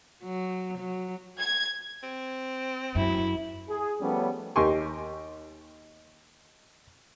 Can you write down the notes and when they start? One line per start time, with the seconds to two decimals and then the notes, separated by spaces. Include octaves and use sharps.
0.24 F#3
0.78 F#3
1.40 G#6
2.03 C4
2.95 F#2 E4
3.69 G#4
4.01 F3 G3 A3 B3 C#4
4.56 D#2 G4 A#4 G#5 C6 C#6